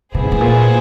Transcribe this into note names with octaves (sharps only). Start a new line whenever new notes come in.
C3 B3 E4 G#4 C5
G#2
A2
A#2